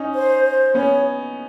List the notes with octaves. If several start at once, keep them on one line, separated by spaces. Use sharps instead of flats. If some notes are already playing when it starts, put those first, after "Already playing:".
Already playing: C#4 D#4
C5
C5
B3 C#4 C#5